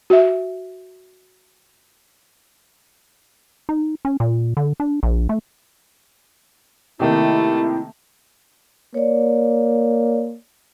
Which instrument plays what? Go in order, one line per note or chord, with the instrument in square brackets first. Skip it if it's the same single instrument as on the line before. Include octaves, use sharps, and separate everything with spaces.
[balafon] F#4 E5
[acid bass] D#4
C#4
A#2
D3
D4
A#1
A3
[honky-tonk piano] C3 D#3 A#3 [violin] A3 [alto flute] E4
[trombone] A#3 [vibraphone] C#5 D5